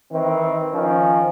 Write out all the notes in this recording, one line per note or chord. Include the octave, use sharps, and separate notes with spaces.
D#3 E3 C4
D#3 F3 C#4